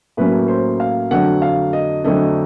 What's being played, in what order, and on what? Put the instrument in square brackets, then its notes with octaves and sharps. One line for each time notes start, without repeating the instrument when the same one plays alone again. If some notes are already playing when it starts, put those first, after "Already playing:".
[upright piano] A2 F#3 A#3 C#4 B4
C5
F5
F2 D3 F#3 A3 D4 F#5
F5
D#5
F2 D3 F#3 A3 D4 D#5